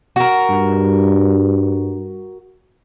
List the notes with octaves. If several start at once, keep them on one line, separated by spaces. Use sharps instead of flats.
F#4 A#4
G2